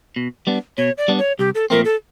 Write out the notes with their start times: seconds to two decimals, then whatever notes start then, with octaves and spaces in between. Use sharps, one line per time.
0.16 B2
0.47 G3 B3 D4
0.78 B2 C#5
0.98 D5
1.08 G3 B3 D4
1.18 C#5
1.39 C2 G4
1.55 A4
1.70 A#2 F3 A3 C4 A#4
1.85 A4